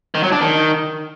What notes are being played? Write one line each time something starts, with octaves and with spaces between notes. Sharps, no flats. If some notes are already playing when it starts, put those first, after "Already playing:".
D#3
F#3
D4
D#3